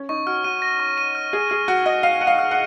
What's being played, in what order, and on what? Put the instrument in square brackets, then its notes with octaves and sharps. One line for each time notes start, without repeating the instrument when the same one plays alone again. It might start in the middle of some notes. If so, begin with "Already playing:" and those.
Already playing: [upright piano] C#4
[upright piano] D#4 [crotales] C#6
[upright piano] F#4 [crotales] F6
[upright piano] F#4 [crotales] D#7
[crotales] A#6
C#6
D#7
F6
[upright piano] G#4 [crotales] F6
[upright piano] G#4 [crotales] F6
[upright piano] F#4 [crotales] F6
[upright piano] D#5 [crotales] F6
[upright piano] F5 [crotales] D#7
[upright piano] F#5 [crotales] D#7
[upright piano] F5
[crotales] F6
[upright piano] F#5